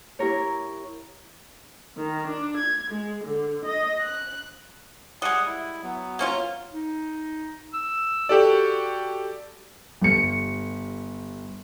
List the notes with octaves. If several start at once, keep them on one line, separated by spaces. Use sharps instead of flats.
E4 G4 A#4 C#5
D#3
D4
G#6
G#3
D3
D#5
F#6
G3 G#3 F#5 D#6
E4
F#3 B3
A#3 C#4 F4
D#4
E6
F#4 G4 A4 D5
G1 C#7